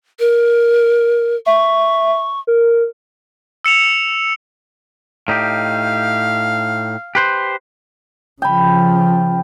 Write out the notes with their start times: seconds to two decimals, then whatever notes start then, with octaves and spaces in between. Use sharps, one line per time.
0.20 A#4
1.46 E5 C#6
2.47 A#4
3.64 E6 C#7 E7 F7
5.28 A2 D#4 G4 F5
7.15 G4 B4 C5
8.42 C#3 F3 G5 B5